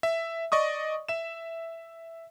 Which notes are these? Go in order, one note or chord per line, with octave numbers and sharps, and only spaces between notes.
E5
D5 D#5 C#6 D#6
E5 E7